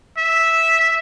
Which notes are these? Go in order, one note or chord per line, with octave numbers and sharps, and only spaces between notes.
E5